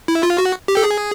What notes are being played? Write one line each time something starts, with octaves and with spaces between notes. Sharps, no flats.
E4
F4
F#4
G4
A4
G#4